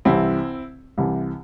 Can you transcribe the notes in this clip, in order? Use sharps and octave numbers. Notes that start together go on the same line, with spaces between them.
C2 C3 E3 C4 E4
C2 C3 E3